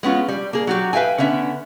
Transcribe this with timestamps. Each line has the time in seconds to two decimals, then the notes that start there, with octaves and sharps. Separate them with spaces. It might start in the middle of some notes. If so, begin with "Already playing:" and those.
0.03 G#3 B3 C#4 F4
0.28 G3
0.53 A#3 G#4
0.67 F#3 F#4 G4
0.93 B4 E5 F5 G5 G#5
1.18 D3 B3 C#4 E5